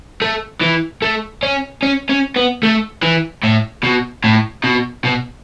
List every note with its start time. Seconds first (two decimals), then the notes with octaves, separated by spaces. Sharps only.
0.22 A3
0.61 E3
1.02 A3
1.43 C#4
1.83 C#4
2.09 C#4
2.36 B3
2.63 A3
3.03 E3
3.43 A2
3.83 B2
4.24 A2
4.64 B2
5.04 B2